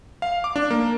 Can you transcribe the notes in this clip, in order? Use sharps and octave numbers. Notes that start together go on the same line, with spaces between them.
F5
D6
D4
A#3